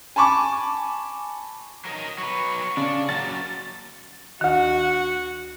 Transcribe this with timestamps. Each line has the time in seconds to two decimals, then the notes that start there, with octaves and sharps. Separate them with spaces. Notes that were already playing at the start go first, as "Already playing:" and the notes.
0.16 G#5 A5 B5 C#6 D6
1.85 F#3 A#4 D#5
2.18 F#3 B4 C#6
2.77 C#3 D4 D5
3.09 F#3 A#3 F#4 A6
4.41 D2 D#3 F#4